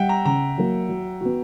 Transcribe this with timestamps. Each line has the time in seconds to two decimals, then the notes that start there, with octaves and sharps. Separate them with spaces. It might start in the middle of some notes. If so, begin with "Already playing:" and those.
Already playing: G3 E5 F#5 G5
0.09 A#5
0.25 C#3 A#5
0.58 F#3 A#3
0.89 F#3
1.21 B3 F#4